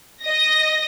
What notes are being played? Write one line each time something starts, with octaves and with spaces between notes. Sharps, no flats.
D#5 A#6